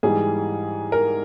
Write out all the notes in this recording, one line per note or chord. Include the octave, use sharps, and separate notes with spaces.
G#2 E3 G3 G#4
A#4